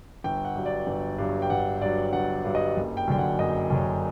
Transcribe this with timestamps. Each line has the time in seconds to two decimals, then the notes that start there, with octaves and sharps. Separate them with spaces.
0.24 G1 G5
0.45 F#5
0.55 G2 F#3
0.66 D5
0.87 G1
1.18 G2 F#3
1.42 G5
1.50 G1 F#5
1.81 G2 F#3 D5
2.13 G1 F#5
2.44 G2 F#3
2.55 D#5
2.76 F#1
2.97 G5
3.07 F#2 D3 F#3 G5
3.18 F#5
3.39 F#1 D#5
3.70 F#2 D3 F#3